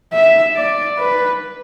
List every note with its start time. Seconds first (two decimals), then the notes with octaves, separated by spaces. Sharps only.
0.13 E5
0.56 D5
0.98 B4